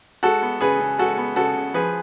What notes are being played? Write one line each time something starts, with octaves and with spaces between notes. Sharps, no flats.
G#3 F#4 A4
B3
C#3 G#4 B4
C#3
G#3 F#4 A4
B3
C#3 F#4 A4
C#3
F3 G#4 B4